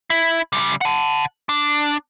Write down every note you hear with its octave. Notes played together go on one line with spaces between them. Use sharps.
E4
C#3 G3
F#5 A5
D4